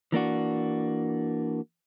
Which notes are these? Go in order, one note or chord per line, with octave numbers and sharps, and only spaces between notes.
E3 A#3 D4 F#4